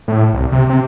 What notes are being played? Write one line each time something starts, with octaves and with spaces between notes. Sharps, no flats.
A2
C2
C3
C3